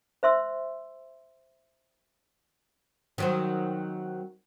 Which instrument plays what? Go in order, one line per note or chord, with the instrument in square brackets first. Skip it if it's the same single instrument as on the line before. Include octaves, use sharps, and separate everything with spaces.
[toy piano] C5 E5 C6 E6
[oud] D#3 F#3 C4